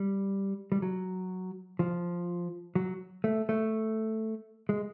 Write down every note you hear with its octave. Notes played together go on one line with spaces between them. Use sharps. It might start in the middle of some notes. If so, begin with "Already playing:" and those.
Already playing: G3
G3
F#3
F3
F#3
A3
A3
G#3